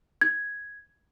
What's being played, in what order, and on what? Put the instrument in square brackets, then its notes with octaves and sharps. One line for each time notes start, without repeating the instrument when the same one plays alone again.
[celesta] G#6